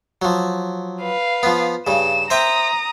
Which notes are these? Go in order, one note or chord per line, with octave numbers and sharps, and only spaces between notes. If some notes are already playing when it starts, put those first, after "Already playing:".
F3 F#3
B4 F5
F3 B3
G2 C#3 E7
C5 E5 G5 A#5 D#6